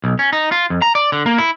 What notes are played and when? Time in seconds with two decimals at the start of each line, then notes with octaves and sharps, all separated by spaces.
0.04 B1
0.19 C#4
0.33 D#4
0.52 F4
0.70 F2
0.82 A#5
0.95 D5
1.12 D3
1.26 A#3
1.38 E4